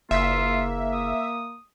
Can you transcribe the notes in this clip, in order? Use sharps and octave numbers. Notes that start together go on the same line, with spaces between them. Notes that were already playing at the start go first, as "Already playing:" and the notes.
F#1 A#3 F4 E5
D#6